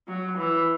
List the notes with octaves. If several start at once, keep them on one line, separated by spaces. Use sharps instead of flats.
F#3
E3